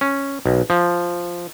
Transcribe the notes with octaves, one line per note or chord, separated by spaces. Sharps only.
C#4
B1
F3